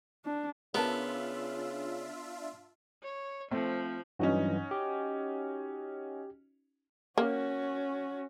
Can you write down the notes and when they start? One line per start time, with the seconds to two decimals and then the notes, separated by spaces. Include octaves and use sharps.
0.25 D4
0.75 C#3 B3 D4 F4 A#4 E5 A5
3.03 C#5
3.51 F3 A3 C4
4.19 G2 E3 F#3 C#4 D#4 F#4
4.71 G4
7.18 A#3 C#4 F#4